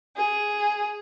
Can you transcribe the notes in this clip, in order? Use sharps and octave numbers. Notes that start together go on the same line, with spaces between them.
G#4